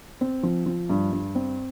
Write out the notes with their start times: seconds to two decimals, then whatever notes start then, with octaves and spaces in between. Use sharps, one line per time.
0.21 C4
0.43 F3
0.66 F3
0.90 G2
1.12 G2
1.35 C4